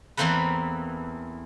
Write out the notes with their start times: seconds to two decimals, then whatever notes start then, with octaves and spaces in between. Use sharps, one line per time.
0.17 E2 E3 A#3 C4 A4 B4